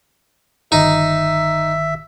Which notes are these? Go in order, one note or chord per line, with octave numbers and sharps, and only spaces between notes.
G1 D#3 D#4 E5